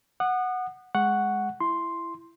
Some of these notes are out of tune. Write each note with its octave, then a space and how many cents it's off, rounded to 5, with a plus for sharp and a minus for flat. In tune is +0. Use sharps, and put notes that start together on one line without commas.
F#5 -5 D#6 -35
G#3 +0 F#5 +0 C#6 +0
E4 +20 C6 +0